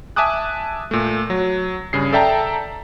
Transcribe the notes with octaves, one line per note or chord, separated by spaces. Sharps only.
E5 G#5 A5 D6 D#6 F#6
A#2 A3
F#3
G2 C#3 G#4 C7
A4 D5 E5 G5 A5 A#5